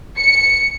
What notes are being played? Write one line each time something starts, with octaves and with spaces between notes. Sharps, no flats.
C#7